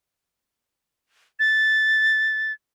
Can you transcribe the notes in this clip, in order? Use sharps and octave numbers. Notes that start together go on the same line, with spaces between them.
A6